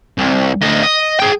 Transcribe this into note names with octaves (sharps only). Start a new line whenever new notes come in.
C2
D2 D#5
D#5
G#4 G5